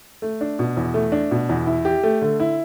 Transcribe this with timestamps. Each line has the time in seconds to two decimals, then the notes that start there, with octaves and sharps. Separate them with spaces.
0.22 A3
0.41 D4
0.59 B2
0.77 E2
0.94 A3
1.12 D4
1.31 B2
1.49 E2
1.66 E4
1.85 G4
2.03 A3
2.22 D3
2.40 E4